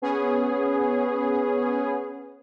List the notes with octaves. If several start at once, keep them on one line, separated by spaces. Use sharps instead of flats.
B3 C#4 G#4